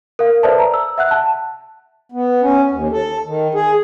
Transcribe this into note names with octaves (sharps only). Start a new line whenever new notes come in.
A#4 F5
A4 B4 C5 D5 E5 A5
A#5
E6
E5 F#5 F#6
A5
B3
C#4
D#2
A4
D#3
G#4